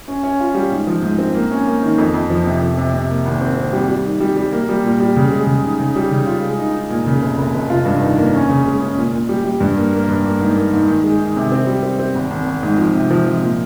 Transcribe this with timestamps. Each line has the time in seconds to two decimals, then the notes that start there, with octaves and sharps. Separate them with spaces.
0.08 C#4
0.23 C#4
0.40 F4
0.55 G3
0.71 G#2
0.87 F3
1.03 G#2
1.18 C4
1.35 A#3
1.51 C#4
1.67 A#3
1.83 D#3
1.98 F2
2.14 F2
2.30 F3
2.46 C3
2.62 F2
2.77 C3
2.94 C3
3.09 A#3
3.25 G#1
3.41 C4
3.57 C4
3.73 G3
3.89 G3
4.05 D#3
4.20 G3
4.36 G3
4.52 A#3
4.69 G3
4.84 A#2
5.00 G3
5.16 C#3
5.31 G#3
5.47 C#3
5.63 D#4
5.80 C#3
5.96 G3
6.12 C#3
6.27 F4
6.43 G#3
6.59 D#4
6.75 D#4
6.90 A#2
7.07 C#3
7.22 F1
7.38 F1
7.54 F1
7.70 F4
7.85 G2
8.02 D#3
8.17 A#3
8.34 C#4
8.49 C#3
8.65 G#3
8.81 C#4
8.97 A#2
9.13 A#2
9.29 G3
9.45 G3
9.60 G2
9.77 A#3
9.93 A#3
10.08 G2
10.25 A#3
10.40 G#2
10.56 A#3
10.73 G#2
10.88 D#3
11.04 G#3
11.19 D#3
11.36 C3
11.52 C4
11.67 G3
11.83 C4
11.99 C4
12.15 G#1
12.31 G#1
12.47 G#1
12.63 G#2
12.78 F3
12.94 C3
13.11 F3
13.26 F3
13.42 A#2